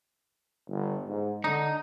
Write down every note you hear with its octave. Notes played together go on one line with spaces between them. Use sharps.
G1
G#2
D3 D#4